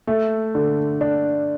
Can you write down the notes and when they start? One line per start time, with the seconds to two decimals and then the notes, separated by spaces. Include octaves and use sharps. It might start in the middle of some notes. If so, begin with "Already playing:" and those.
0.07 A3
0.55 D3
1.01 D4